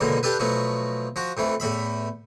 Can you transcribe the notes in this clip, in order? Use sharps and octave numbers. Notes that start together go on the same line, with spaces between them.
C#2 F#2 B2 D3 A#3
D4 G4 A4 B4
B2 F3 F#3 A3
F3 F#4
F2 E3 A3
E2 A2 E5 B5